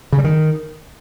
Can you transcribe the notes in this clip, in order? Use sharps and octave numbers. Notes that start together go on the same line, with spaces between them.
C#3
G3
D#3